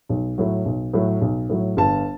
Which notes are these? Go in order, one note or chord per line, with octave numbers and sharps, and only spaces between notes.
B1
A2 F#3
B1
A2 F#3
B1
A2 F#3
G1 A5